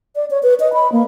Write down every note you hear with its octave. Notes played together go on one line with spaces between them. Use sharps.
D5
C#5
B4
D#5
B5
A#3